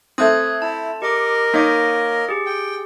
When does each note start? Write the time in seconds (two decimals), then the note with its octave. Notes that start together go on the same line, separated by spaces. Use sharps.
0.18 A3 C4 D#6 F#6 G#6
0.62 E4 A5
1.02 G4 A#4 D#5 D6
1.54 A#3 D#4 C#5 D6
2.29 G4 G#4
2.46 G5